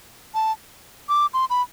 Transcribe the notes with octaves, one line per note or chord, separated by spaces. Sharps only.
A5
D6
C6
B5